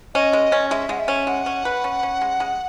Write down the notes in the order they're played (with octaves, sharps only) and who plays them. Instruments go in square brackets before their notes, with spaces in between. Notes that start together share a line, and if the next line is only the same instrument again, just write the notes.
[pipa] C#4 [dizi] D#5
[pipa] G#3
C#4
[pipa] G#3 [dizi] E5
[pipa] G#3 [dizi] F#5
[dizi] E5
[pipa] C#4
[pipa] G#3 [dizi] F#5
[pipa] C#4
B4
C#4
C#4
G#3
G#3